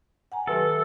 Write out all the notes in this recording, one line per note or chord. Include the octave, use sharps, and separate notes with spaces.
F#5 G#5 A#5
D#3 F#3 G4 A4 B4 E5